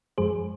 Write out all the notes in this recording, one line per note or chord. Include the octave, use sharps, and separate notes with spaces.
F#2 F3 G#3 G#4 C5